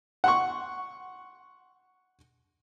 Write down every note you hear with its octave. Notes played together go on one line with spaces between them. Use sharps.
F#5 C6 C#6